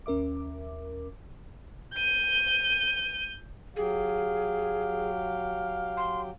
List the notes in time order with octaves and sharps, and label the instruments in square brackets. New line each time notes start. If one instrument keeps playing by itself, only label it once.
[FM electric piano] D#2 C#4 A#4 E5 D6
[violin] G6 D#7
[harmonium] F#3 G4 [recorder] G#4 [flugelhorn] F5
[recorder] C6